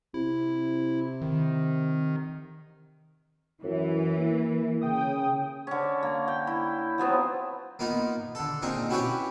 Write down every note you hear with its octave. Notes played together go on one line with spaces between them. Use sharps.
C3 E4
D#3
F#2 E3
A#3
C#3 G5 D#6
D3 C#4
A#3
G5
E4
F3 F#3 B3 C4
A#3 B3 D#4 F4
D3 A4
A#2 C4 D#4 G#4
C#4 E4 F#4 G4 B4 C#5